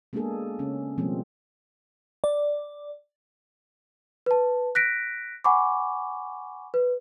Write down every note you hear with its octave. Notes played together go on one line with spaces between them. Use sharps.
G#3 A#3 B3 D4 G#4 A4
C#3 C#4
B2 F3 G3 G#3 A#3 C4
D5
B4 A5
F#6 A#6 B6 D7
F#5 G#5 B5 C#6 D6
B4